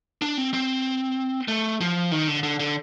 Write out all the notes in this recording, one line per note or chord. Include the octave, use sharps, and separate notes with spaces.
D4
C4
C4
A3
F3
D#3
D3
D3
D3